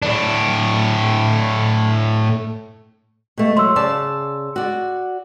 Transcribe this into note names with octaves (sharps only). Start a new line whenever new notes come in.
A2 D4
B2 A3
F#3 C6 E6
C#3 D5 A5
F#4 D5